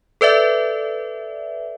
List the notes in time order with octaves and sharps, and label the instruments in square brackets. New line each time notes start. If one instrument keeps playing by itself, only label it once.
[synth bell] A4 B4 D5 E5